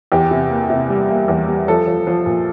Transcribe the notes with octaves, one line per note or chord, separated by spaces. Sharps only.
E2 G4
C3
A#3
C3
G3
A#3
E2
G3
F3 A4
F3
F3
A#2